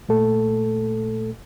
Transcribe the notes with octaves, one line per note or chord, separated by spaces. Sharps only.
A#2 A3 A4